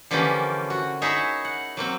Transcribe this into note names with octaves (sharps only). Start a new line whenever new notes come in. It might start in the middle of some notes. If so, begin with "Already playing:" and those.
D3 E3 F3 A#3 C#4 G4
F#4
D#4 E4 G#4 C#5 E5
F#5
F#3 A#3 C4